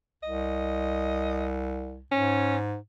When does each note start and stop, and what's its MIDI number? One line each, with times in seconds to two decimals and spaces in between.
0.23 2.05 36
0.23 1.46 75
2.12 2.77 44
2.12 2.57 61